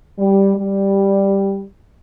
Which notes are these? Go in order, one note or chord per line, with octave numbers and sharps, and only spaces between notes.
G3
G3